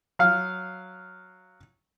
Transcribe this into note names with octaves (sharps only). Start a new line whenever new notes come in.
F#3 F5 F6